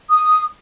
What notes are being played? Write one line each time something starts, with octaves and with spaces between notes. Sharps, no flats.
D#6